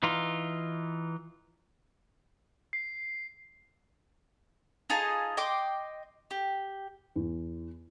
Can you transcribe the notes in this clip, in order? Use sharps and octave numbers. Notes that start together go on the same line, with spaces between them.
E3 D#4 F4
C7
D#4 F4 G#4 A5
D#5 G5 C6 D6
G4
E2